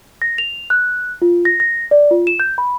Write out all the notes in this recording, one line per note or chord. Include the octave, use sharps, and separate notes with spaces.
A#6
F7
F#6
F4
A#6
A#6
D5
F4
E7
G6
B5